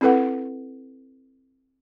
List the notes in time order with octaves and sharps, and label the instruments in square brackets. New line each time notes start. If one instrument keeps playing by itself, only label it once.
[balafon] C4 E4 A4 B4 F#5